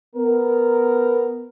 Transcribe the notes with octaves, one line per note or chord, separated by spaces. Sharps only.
B3 A#4